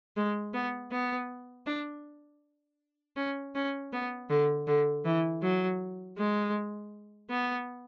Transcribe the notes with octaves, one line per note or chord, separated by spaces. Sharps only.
G#3
B3
B3
D4
C#4
C#4
B3
D3
D3
E3
F#3
G#3
B3